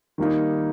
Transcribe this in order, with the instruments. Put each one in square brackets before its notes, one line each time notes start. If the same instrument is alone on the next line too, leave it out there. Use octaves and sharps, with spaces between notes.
[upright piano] D#3 G3 A#3 D#4